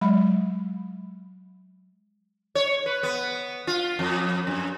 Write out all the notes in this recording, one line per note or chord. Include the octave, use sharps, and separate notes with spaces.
F#3 G#3 B5
C#5
B4
B3
F4
F2
F#2